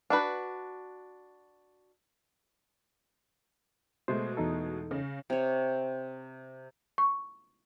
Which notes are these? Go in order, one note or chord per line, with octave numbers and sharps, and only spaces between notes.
D4 F#4 B4
B2 G#3 A3 C5
E2 D#4 A4
C#3
C3 C#5
C#6